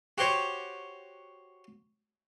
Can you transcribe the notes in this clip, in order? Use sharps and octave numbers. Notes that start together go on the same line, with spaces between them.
F#4 G4 C5 C#5